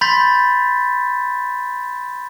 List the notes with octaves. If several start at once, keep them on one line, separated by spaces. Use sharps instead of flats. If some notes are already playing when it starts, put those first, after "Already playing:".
B5 C6 G6 A6 B6